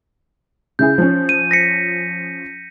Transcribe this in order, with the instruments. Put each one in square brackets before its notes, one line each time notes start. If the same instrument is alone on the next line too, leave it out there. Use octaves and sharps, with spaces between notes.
[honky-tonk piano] C#3 E4 G#4 [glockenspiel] G6
[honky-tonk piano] F3 C#4
[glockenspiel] D#7
A#6 B6 C#7